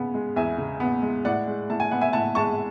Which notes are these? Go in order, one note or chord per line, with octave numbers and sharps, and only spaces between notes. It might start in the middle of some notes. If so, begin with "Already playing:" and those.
Already playing: C#3 B3
G#3
E2 E5 G#5
C#3
B3
G#3
A2 D5 F#5
G#3
A2 A5
G#5
B3 F#5
E5 G#5
A2 F#5 A5
G#3 A5 C#6